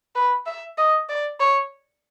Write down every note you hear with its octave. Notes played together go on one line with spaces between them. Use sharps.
B4
E5
D#5
D5
C#5